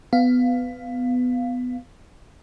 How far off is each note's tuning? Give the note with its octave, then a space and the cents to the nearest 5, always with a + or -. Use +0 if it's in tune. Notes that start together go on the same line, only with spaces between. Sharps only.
B3 +15 F5 +0